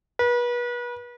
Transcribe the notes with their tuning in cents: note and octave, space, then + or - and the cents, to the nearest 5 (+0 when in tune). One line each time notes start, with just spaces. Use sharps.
B4 -35